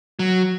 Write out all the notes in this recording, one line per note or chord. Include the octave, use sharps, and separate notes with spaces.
F#3